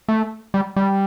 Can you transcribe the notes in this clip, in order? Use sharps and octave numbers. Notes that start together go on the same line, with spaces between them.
A3
G3
G3